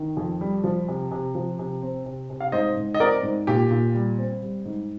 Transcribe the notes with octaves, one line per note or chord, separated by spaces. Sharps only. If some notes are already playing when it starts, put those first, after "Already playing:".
Already playing: D#3
F2
G3
F3
C3
C3
F3
C3
C4
C3
C3
F5
G#2 C5 D#5
G#2
D#5
C4 A#4 D5
G#2
A#2 G4
A#2
G3
C4
G3
G#2